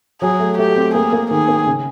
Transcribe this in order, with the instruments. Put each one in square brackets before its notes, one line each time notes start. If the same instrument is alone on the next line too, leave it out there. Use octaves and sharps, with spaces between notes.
[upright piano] F#3 [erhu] G#4
[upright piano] A3
[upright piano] A3 [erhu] G4
[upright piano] C4
[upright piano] A#3 [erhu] G#4
[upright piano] A#3
[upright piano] D#3 [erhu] G#4
[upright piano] A#3
C#3